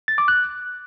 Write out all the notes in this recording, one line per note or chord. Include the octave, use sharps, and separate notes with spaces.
A6
D6
F#6